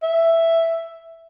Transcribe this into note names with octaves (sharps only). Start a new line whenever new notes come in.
E5